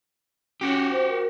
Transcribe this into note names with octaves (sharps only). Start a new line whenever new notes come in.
C#4 F#4 G4
C5
A#4